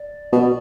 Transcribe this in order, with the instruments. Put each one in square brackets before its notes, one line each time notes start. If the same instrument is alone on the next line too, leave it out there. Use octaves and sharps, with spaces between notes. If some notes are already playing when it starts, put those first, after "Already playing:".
Already playing: [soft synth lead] D5
[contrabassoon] B2